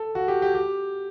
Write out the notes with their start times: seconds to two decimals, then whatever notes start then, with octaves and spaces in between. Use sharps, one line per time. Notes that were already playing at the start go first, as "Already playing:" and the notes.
Already playing: A4
0.15 F#4
0.28 G4
0.42 G4
0.55 G4